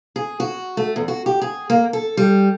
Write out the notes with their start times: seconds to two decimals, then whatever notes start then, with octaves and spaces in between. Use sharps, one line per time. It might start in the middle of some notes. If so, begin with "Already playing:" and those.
0.16 G#4
0.40 F#4
0.77 A3
0.96 E2
1.08 F#4
1.26 G4
1.41 G#4
1.70 A#3
1.93 A4
2.17 G3